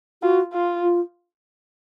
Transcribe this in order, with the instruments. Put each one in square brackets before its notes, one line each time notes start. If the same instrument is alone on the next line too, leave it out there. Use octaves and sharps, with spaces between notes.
[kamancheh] F4 [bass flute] F#4
[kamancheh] F4
[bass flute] F4